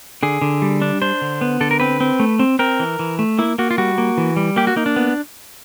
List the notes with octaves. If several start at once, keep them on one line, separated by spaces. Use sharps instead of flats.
D3 G#4
D3
G3
D4
D4 C5
D3
B3
D3 A4
A#4
C4 B4
C4
A3
C4
C4 A#4
E3
E3
A3
A#3 E4
A#3 F#4
F4
G3 F#4
A#3
E3
G3
A#3 G4
F#4
A#3 D#4
D4
B3